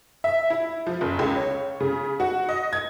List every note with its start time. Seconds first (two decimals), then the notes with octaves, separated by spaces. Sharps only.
0.24 E5
0.50 E4
0.87 F3
1.01 F#1
1.19 C#2
1.36 C#5
1.81 C#3
2.20 F#4
2.49 D#5
2.73 G#6